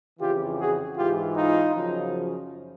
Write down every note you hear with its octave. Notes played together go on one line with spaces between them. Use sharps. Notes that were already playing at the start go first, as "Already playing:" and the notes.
F2 C#3 E3 F4 G4
F#4 G#4
G#2 E3 F4 G4
D#4 F4
F#2 C#3 F3